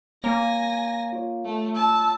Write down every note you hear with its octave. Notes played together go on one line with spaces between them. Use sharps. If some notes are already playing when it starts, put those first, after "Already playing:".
A#3 C#5 G#5 A#5 A#6
F4 C#5
A3
A5 E6